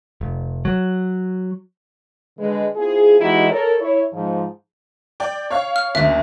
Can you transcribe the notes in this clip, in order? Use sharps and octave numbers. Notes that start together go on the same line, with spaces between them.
F1
F#3
D3 G#3 B4
C4 E4 F4 G#4
E3 G#3 D#4 E4 F#4 G4
A4 A#4 C#5
E4 C#5
G#2 F3
D5 G5
C#5 F5 C#6
F6
F#1 D2 E5